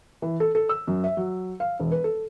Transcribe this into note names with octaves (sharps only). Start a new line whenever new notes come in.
E3
A4
A4
E6
F#2
E5
F#3
F5
E1
B4
A4